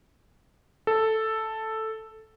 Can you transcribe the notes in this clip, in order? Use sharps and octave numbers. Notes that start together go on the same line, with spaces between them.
A4